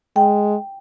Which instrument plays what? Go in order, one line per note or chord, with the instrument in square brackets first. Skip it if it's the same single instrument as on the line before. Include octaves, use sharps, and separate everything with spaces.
[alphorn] G#3 [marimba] G5